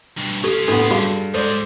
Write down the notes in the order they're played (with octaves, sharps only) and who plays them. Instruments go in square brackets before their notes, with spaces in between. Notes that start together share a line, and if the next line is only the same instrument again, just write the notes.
[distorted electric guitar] G2 B2
[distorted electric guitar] C#4 F4 [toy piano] G4 A4
[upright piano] A2 B3 [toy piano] D4 A4
[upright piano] G2 [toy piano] F#4 G#4 F5
[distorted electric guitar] G#2 G#3 [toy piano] A4 [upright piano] C5 D5